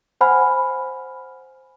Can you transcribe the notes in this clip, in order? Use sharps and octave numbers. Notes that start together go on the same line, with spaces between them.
C5 F#5 G#5 B5 F6